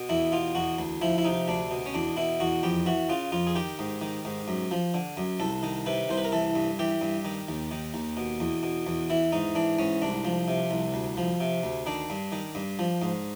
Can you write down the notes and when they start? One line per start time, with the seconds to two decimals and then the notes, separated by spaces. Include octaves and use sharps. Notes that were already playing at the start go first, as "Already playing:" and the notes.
Already playing: B2
0.09 E2 E4
0.32 B2 F4
0.55 E2 F#4
0.79 D2
1.01 F3 E4
1.18 E4
1.25 C3 D#4
1.48 D2 D4
1.71 B2
1.86 C#4
1.94 E2 D4
2.17 B2 E4
2.40 E2 F#4
2.63 F2 G4
2.86 E3 F#4
3.09 C#3 F4
3.32 F2 F4
3.47 G#4
3.55 D#3 G4
3.79 G#2
4.02 D#3
4.25 G#2
4.48 F#2
4.71 F3
4.94 D3
5.17 F#2
5.40 C2 A4
5.63 D#3
5.86 C3 B4
6.09 C2 C5
6.17 B4
6.24 A#4
6.32 E3 A4
6.55 G2
6.79 E3 G4
7.01 G2
7.25 D#3
7.49 D#2
7.71 D#3
7.94 D#2
8.17 B2
8.40 E2
8.63 B2
8.87 E2
9.10 E3 E4
9.32 G#2 D#4
9.55 E3 D4
9.79 G#2 C#4
10.02 C2 D4
10.25 F3
10.48 C3
10.71 C2
10.94 D2
11.17 F3
11.40 C3
11.63 D2
11.86 D#3 D4
12.10 G2
12.32 D#3
12.55 G2
12.79 F3
13.02 G#2